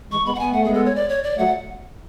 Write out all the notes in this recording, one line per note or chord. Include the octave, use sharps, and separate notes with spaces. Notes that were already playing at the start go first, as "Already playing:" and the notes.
E3 G#3 C#6
G#3 B3 B5
F#5
B3 G#5
A3 F#5
G#3 B3 G#4
A4
C#5
D5
C#5
D5
F#3 A3 F#5